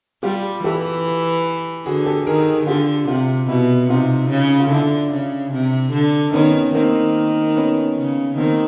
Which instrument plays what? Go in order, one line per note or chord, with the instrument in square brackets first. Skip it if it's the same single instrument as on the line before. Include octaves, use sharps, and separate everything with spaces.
[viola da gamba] G3 [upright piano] F4 G4
[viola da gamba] E3 [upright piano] G4 A4
[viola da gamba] D3 [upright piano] F#4 G#4
[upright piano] G4 A4
[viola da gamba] D#3 [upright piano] G#4 A#4
[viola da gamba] D3 [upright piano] F4 G4
[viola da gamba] C3 [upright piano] F4 G4
[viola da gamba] B2 [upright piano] E4 F#4
[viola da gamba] C3 [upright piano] D#4 F4
[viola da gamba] C#3
[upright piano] F4
[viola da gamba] D3 [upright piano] D4 E4
[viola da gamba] C#3
C3
D3
[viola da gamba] D#3 [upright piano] B3 C#4
[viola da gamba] D#3 [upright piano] A#3 C4
[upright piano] B3 C#4
[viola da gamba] C#3
[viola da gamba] D#3 [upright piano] A#3 C4